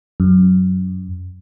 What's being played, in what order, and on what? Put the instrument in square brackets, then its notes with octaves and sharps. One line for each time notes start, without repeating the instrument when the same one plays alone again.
[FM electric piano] F#2